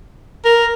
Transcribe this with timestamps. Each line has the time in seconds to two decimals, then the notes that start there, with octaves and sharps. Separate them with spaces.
0.45 A#4